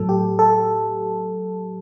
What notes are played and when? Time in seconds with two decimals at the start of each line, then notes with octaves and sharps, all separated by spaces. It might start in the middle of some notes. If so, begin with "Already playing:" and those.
Already playing: A2 F#3 A4
0.09 G4
0.39 A4